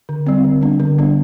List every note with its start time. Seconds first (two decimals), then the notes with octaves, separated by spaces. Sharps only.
0.09 D3
0.27 G3 C4
0.44 D3
0.62 G3 B3 D4
0.80 D3
0.98 G3 B3 D4